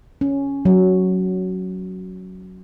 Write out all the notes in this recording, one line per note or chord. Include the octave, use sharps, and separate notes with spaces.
C#4
F#3